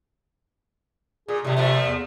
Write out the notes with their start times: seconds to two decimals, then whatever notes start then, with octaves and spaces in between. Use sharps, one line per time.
1.28 A#2 G#4
1.45 A2 C3 G3
1.56 A#2 F3 A3
1.87 E2